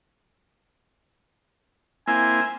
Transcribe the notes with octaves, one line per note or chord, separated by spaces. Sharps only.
A#3 C4 E4 G#5